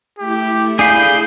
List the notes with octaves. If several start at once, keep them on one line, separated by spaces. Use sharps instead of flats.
A3 E4 G4
D4 G#4 F5 B5 G6